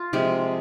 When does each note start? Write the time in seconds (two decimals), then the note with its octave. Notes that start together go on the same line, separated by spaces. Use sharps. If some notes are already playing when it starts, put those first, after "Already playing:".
Already playing: F4
0.13 C3 F3 G#3 G4